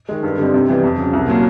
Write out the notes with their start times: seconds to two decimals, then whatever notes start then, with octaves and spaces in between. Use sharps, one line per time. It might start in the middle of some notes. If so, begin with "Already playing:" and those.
0.09 D#3 G#3
0.23 G2
0.38 D3 G3 C4 D#4
0.54 C3
0.68 E3 G3 B3
0.84 F2
0.98 C#3 F#3
1.13 C2
1.28 A#2 F#3 A#3